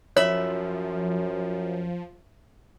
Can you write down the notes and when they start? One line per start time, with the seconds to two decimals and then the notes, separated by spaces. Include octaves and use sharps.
0.17 F#2 F3 C#5 E5 B5